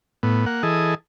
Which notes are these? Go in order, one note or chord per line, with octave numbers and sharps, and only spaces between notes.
A2 B3
A#3 F#5
E3 G#4 A4 D#5